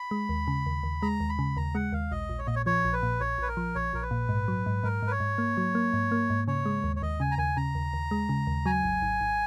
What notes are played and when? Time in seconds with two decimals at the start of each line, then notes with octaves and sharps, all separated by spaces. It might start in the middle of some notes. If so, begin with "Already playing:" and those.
Already playing: B5
0.11 G#3
0.29 D#2
0.48 C#3
0.66 D#2
0.83 D#2
1.02 G#3 A#5
1.20 D#2
1.29 B5
1.39 C#3
1.57 D#2 A#5
1.75 G#3 F#5
1.93 D#2 F5
2.11 A#1 D#5
2.29 A#1
2.39 C#5
2.47 A#2 D#5
2.56 C#5
2.66 F3 C#5
2.85 A#1
2.93 B4
3.03 A#2
3.20 A#1 C#5
3.38 A#1 B4
3.48 A#4
3.57 F3
3.75 A#1 C#5
3.93 A#1 A#4
4.02 B4
4.11 A#2
4.29 G#2
4.48 F#3
4.66 G#2
4.84 G#2 A#4
5.03 G#2 B4
5.11 C#5
5.20 G#2
5.38 A#3
5.57 F#3
5.75 A#3
5.93 G#2
6.12 A#3
6.30 G#2
6.48 C#3 C#5
6.66 G#3
6.84 D#2
6.96 C#5
7.02 D#2 D#5
7.20 C#3 G#5
7.31 A#5
7.38 D#2 G#5
7.57 C#3 A#5
7.75 D#2
7.93 D#2
8.11 G#3
8.29 C#3
8.47 D#2
8.66 F#3 G#5
8.84 G#1
9.02 G#1
9.21 G#1